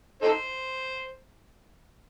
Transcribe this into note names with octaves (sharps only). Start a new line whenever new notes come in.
D#4 A4 C5